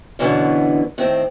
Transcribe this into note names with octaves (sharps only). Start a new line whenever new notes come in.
F#2 B2 D3 E3 B3
A2 D#3 C4